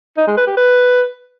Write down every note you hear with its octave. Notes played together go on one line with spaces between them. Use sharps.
D#4
G#3
B4
G4
B4